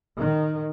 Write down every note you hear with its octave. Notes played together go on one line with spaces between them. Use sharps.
D#3